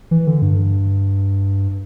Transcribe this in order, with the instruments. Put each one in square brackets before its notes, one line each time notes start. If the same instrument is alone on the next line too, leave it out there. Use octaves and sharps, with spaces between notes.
[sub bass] E3
D3
G2